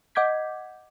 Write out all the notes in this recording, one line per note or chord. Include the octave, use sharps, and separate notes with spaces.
D#5 F#5 D6 G6 G#6 B6